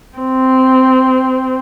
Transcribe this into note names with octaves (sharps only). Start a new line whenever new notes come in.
C4